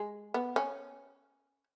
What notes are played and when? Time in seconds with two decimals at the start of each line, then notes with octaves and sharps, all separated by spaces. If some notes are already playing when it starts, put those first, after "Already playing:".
Already playing: G#3
0.34 B3
0.56 C#4